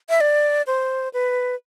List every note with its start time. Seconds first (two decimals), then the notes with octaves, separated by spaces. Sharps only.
0.09 E5
0.20 D5
0.67 C5
1.13 B4